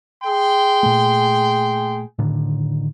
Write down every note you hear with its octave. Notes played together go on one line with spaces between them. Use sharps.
G#4 G5 C6
A#2 A3
A2 D3 D#3